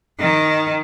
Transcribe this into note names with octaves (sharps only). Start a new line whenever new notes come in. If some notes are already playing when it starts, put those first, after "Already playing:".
D#3